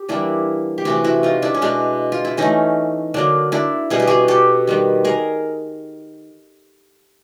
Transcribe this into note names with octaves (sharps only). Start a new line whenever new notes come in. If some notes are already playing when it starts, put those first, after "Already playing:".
Already playing: G4
E3 G3 A#3 D4 E4
G4
C3 E3 A3 E4 F#4
E4 F#4
D#4 F4
D4 E4
C#4
B2 G#3 B3 D4
F4
E4
E3 A3 C#4 D#4
D3 F#3 A#3 D4
D4 E4
B2 G3 B3 G#4
G4
F#4 G#4
G4 A4
D#3 G3 B3
G#4 A#4